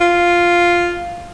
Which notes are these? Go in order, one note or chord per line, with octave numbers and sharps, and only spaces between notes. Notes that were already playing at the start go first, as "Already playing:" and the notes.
F4